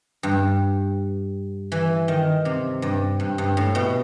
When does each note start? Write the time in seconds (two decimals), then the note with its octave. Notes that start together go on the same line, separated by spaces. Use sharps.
0.23 G2
1.72 E3
2.08 D#3
2.45 C3
2.82 G2
3.20 G2
3.38 G2
3.57 A2
3.75 B2